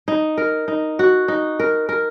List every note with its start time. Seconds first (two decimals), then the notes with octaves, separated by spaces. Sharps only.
0.08 D#4
0.37 A#4
0.68 D#4
0.99 F#4
1.28 D#4
1.60 A#4
1.89 A#4